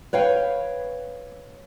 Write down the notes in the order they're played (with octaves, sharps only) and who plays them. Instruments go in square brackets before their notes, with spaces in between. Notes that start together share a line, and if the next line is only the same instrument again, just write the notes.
[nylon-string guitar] B4 C#5 F5 G5